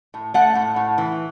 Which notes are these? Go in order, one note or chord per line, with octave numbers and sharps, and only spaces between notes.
A2
A3 F#5
A2
A2
E3